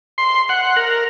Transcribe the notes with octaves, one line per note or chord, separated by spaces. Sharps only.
C6
F#5
A#4